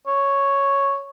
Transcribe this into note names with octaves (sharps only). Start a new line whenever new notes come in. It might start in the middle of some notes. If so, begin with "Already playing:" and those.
C#5